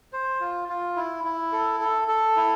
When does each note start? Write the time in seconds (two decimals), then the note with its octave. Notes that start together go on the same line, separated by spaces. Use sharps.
0.13 C5
0.40 F4
0.69 F4
0.96 E4
1.24 E4
1.52 A4
1.80 A4
2.08 A4
2.36 E4